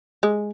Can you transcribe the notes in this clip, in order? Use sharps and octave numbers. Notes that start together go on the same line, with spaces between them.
G#3